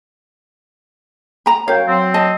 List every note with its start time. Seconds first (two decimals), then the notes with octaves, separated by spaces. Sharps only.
1.46 A#5 B5
1.68 F#2 C#5 F5 G5
1.88 F#3 C4
2.14 D#5 A5